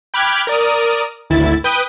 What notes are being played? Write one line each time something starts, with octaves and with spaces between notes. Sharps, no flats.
G5 B5 D6 F6 F#6 G#6
A#4 D5 D#6
G#1 D2 E4 A6
B4 G5 D#6 G6 D#7